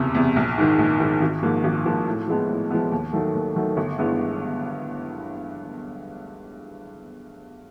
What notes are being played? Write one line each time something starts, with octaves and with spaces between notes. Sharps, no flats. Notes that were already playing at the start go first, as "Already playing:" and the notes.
Already playing: F#1 E2 C3
E2 C3
A#1
G#2 D#3
A#1
G#2 D#3
G#1
G#2 F3 A#3
G#1
G#2 F3 A#3
A2
F3 G#3 B3
A2
F3 G#3 B3
D#2
D#3 F#3 A3
D#2
D#3 F#3 A3
G1
G2 E3 G#3 B3